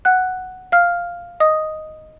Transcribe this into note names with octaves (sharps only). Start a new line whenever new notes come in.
F#5 F#6
F5 F6
D#5 D#6